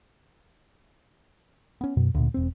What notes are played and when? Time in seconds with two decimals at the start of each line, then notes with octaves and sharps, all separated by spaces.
1.81 B3 C#4
1.97 F#2 B2
2.15 D2 A#2
2.34 E1 C4